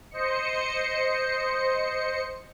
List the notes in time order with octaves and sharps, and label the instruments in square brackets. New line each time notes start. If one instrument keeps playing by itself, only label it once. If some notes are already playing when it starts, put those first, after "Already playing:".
[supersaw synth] C5 D#5 C#7